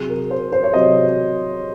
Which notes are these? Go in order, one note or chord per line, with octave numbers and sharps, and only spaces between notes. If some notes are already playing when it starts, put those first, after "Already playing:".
Already playing: C3 F#3 G#4
A#4
C5
C5
C#5
C3 F#3 D#5